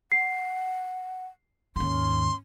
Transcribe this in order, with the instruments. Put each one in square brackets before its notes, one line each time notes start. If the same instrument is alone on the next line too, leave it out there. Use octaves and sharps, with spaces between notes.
[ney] F#5 [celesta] C7
[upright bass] D#2 G#2 [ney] C#4 [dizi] C6